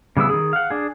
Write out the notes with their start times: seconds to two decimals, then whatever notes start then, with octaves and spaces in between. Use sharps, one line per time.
0.17 C#3 G3 B3 E4 E6
0.29 D#3 G#4
0.53 F5 F#5
0.70 D4 G#4